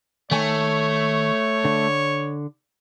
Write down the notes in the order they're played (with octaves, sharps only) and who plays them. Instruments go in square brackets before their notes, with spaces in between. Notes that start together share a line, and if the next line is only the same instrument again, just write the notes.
[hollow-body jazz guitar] D#3 G#5 [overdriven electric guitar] A3 [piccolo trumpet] C#5
[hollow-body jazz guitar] D3